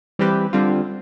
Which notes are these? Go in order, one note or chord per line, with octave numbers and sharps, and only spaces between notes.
E3 G3 C4 G4 B4
D3 G3 C4 F4